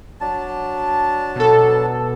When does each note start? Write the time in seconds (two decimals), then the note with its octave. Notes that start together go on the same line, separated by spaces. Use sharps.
0.21 F#3 D4 A5
1.36 B2 A4